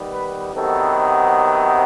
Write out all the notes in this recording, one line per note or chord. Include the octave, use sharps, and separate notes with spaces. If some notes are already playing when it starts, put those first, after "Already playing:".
Already playing: D#3 G3 B3
B4
C3 D#3 F#3 B3 A4